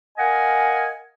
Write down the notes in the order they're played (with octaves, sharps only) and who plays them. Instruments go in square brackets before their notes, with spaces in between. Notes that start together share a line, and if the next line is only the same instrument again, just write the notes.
[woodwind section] A#4 D#5 F5 F#5 G#5